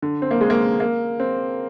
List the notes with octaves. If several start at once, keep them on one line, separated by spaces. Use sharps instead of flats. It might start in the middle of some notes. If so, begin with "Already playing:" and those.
D3
C4
A#3
G#3
A#3
A#3
C4